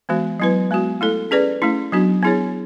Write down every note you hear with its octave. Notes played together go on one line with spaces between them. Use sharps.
E3 G#3 B3 F#4
F#3 B3 E4 B4
G#3 B3 F#4
A3 E4 A4
C#4 G#4 B4 D5
A3 C#4 E4
F#3 B3 D4 F#4
B3 E4 G#4 C#5